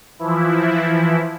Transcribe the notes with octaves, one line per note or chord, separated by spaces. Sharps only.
E3 F3 E4